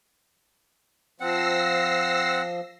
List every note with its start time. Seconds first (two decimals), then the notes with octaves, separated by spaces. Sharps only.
1.20 F3 C4 F#5 E6 A#6 C7